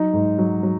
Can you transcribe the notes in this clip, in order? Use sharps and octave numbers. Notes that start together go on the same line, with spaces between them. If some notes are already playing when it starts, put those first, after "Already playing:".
Already playing: F#3 D#4
G#2
F#3
F#3